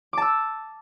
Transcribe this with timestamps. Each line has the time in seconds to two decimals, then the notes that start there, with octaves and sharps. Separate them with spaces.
0.13 D6
0.18 A5
0.22 E6